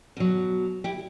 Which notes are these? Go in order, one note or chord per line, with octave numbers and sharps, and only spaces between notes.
B2 F#3
E4 G4